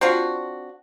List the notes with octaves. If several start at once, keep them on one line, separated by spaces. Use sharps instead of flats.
C4 D4 F4 F#4